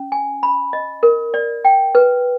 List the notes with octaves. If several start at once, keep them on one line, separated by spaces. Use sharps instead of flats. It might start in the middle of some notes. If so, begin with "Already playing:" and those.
Already playing: C#4
G#5
B5
D#5
A#4
D5
G5
B4